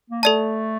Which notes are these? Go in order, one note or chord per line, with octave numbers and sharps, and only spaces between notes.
A#3
A3 A4 D5 A5